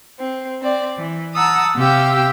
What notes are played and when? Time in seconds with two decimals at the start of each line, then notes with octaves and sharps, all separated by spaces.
0.19 C4
0.61 C4 D5
0.97 E3
1.36 F#5 A5 A#5 D#6 E6
1.76 C3 G4 F5 G5 E6